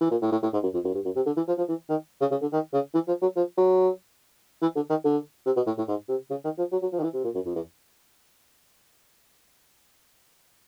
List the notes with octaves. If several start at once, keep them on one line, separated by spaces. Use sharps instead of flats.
E3
A#2
A2
A2
A2
G#2
F#2
F2
F#2
G2
F#2
C3
D3
E3
F3
F3
E3
D#3
C#3
C#3
D3
D#3
C#3
E3
F3
F#3
F3
F#3
E3
D3
D#3
D3
C3
B2
A2
A2
G#2
C3
C#3
D#3
F3
F#3
F#3
F3
D#3
E3
C3
A#2
F#2
F2
E2